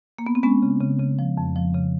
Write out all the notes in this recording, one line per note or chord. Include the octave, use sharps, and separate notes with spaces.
A#3
B3
C4
G#3 B3 C#4
C#3
C#3
C#3
F3
F2
F3
C#3